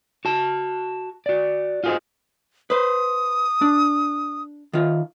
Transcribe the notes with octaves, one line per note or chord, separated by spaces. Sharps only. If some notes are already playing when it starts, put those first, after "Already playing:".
F#4 A5
F#4 D5
F4 F#4 G#4 B4 C5 D#5
B4 C5 D#6
D4
D#3 F4